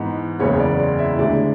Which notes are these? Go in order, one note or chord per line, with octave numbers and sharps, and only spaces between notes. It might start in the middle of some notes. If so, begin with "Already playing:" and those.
Already playing: G#2 E3 B3
F#1 E2 C#3 G#3 B3 C#5
D5
D5
E4 E5
D2 D3 G#3 D5